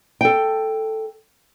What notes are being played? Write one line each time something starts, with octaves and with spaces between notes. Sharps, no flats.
A4 G5